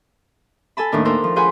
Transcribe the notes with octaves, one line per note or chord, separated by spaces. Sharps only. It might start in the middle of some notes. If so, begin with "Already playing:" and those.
A4 G#5 A5 B5
D#2 A2 D#3 D4 A#4
D4 A4 A#4 C5
F3
F4 G#4 C5 F#5 G#5 B5